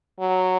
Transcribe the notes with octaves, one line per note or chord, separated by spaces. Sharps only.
F#3